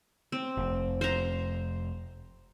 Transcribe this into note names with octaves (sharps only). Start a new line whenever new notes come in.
C4
F1
C5 A#5